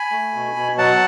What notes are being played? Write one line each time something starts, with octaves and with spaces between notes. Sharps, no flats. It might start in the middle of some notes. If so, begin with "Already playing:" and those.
Already playing: G#5 B5
A3
B2
B2
F#3 F#5 A5